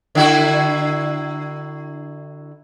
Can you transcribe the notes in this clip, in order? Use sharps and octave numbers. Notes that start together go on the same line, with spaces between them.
D3 E4 F#4